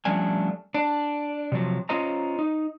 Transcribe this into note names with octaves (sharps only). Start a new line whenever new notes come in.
F3 G3 A3 C#4 D4 G#5
D4 D5
C3 F3 F#3
C#4 F4 C5 D#5 A#5
D#4